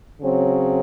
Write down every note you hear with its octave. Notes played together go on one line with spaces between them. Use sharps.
C#3 F#3 C4